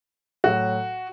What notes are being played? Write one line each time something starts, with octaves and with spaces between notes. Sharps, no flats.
A2 F#3 F#4